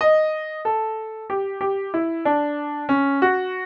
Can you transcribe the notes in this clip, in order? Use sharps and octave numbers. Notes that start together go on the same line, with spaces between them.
D#5
A4
G4
G4
E4
D4
C#4
F#4